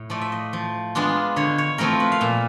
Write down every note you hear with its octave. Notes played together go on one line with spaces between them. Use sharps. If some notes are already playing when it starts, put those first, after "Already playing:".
Already playing: A2
F3 A3 D5
E5
D#5
F3
G#3 B3 D4 F4
D3 C#5
C#5
F3 A3 C4 E4 A#4
B4
F5
A#2 E5